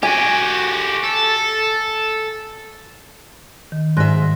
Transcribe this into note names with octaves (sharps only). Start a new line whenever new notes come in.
F#4 G4 G#5
A4
D#3
G#2 E5 C6 F#6 A#6